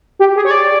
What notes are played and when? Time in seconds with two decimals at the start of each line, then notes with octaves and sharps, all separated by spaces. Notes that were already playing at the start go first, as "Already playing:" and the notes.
0.19 G4
0.36 G#4
0.45 C#5
0.51 D5